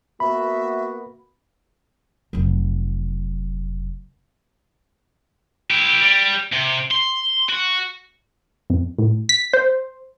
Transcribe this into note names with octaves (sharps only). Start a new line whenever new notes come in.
A#3 B3 F#4 E5 B5
F1 F#3
E4 G4
G3
C3
C6
F#4
F2
A2
B6
C5